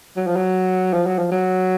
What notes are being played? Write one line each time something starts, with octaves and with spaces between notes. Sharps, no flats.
F#3
F3
F#3
F3
F#3
F3
F#3